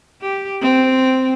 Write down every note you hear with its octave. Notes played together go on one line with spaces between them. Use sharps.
G4
C4